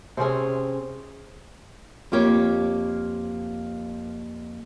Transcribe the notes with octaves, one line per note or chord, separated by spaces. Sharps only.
C3 C4 C#4 G#4
F2 A#3 G4 C#5